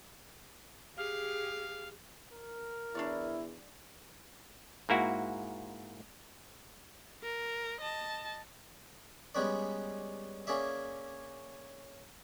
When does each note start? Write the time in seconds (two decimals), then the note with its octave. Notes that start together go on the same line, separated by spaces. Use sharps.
0.97 G4 G#4 F5
2.32 A#4
2.95 E2 D4 E4 C#5 D5
4.89 G#2 A#3 E4 F#4
7.23 A#4
7.81 D#5 A5
9.35 G3 G#3 B3 C#4 B4 D5
10.47 A#3 C#4 G#4 D5 E5